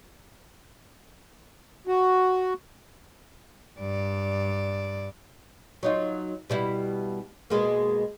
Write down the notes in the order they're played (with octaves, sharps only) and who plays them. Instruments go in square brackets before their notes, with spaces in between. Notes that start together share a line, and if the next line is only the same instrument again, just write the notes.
[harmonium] F#4
[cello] G2 D5
[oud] F#3 D#4 F4
B2 G3 E4
B2 G#3 A#3